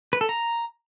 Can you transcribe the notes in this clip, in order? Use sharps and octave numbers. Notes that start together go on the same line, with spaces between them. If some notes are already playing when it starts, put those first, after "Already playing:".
B4
A4
A#5